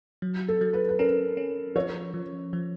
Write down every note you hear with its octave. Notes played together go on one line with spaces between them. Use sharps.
F#3
A4
F#3
B4
B4
C#4 A#4
C#4
F3 C#5
F3
F3